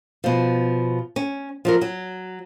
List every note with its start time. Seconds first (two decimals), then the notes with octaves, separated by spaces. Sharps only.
0.24 B2 F3
1.16 C#4
1.65 F3 F#3 A#4
1.81 F#3